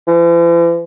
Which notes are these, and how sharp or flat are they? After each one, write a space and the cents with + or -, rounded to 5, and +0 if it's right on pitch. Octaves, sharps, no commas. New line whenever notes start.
E3 +45